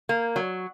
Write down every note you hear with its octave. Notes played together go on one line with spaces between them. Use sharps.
A#3
F#3